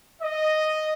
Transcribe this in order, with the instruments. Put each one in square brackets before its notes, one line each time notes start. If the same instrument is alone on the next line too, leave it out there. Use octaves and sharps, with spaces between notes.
[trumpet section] D#5